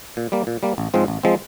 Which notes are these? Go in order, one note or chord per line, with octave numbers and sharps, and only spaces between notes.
A#2
G3 A#3
A#2
G3 A#3
A1
G#2 F3 G#3 C4
A1
F3 G#3 C4